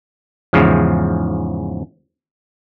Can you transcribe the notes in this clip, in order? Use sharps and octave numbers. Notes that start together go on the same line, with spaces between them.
E2 G#2 C#3 F3